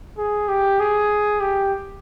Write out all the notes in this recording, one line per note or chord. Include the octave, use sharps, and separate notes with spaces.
G#4
G4
G#4
G4